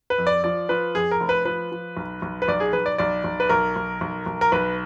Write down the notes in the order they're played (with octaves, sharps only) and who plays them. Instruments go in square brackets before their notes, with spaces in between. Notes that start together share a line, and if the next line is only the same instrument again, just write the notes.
[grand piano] B4
F2
D5
F3 D5
F3 B4
F2 G#4
A#4
F1
B4
F3 B4
F3
B1
B1
B4
B1 D5
G#4
B1 B4
D5
B1 D5
B1
B4
B1 A#4
B1
B1
B1
A#4
B1 B4